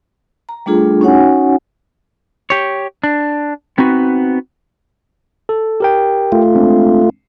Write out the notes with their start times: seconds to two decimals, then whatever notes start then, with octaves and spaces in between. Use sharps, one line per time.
0.49 A#5
0.66 G3 A3 D4 F4 G#4 A4
1.01 C#4 D#4 F#4 C#5 F#5 G#5
2.50 G4 C#5
3.04 D4
3.78 B3 C4 D#4 F#4 B4
5.49 A4
5.80 G4 A#4 G5
6.32 A3 F4
6.55 G#3 C4 D4